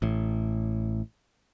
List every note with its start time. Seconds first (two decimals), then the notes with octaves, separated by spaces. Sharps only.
0.02 A1 A2